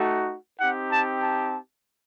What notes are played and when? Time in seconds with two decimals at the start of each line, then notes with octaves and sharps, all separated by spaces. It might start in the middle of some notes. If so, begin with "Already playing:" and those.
Already playing: A3 D#4 F#4
0.60 C4 D#4 G4 F#5
0.91 A5
1.21 A5